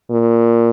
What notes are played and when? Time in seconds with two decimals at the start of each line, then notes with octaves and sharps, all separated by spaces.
0.11 A#2